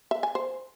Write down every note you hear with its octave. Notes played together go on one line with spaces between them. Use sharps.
E5
G#5
C5